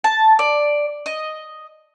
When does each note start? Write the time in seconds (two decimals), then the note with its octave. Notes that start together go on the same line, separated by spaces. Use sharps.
0.04 A5
0.39 D5
1.06 D#5